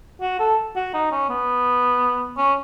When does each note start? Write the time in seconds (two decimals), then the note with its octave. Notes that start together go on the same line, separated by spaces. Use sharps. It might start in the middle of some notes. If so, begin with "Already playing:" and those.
0.21 F#4
0.40 A4
0.76 F#4
0.94 D#4
1.11 C#4
1.29 B3
2.37 C#4